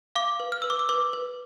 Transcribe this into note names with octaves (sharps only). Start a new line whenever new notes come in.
F5 D6
B4
F6
B4 E6
D6
E6
B4 D6
B4